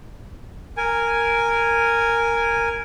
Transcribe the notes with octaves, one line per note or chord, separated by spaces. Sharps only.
A#4 G#5